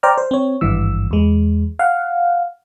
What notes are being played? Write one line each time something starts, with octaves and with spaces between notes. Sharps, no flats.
C5 D5 G5 A#5 F6
C5
C4 C#5
G#1 G2 E3 E6
E2 G#3
F5 F#5